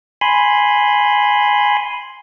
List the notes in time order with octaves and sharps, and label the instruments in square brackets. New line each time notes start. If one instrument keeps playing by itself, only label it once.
[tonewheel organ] G#5 B5 C6